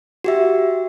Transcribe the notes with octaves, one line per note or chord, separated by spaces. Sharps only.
F#4 G4 E5